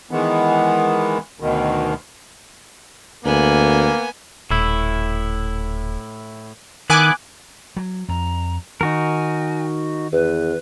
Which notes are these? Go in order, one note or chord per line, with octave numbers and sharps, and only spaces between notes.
D#3 E3 G#3 B3
D2 B2 D#3
D2 A#3 B3 G#5
D#1 A2 E4
D#3 B3 E4 G#5 D6 F#6
F#3
F2 A#5
D#3 D#4 F#4 A#4 G#5
E2 B4